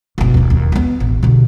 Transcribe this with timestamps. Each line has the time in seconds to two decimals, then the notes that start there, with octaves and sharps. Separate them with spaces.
0.18 F#1 B2
0.34 E1 D#2
0.50 D#2
0.72 A#3 B3
1.00 A1
1.23 B2 D3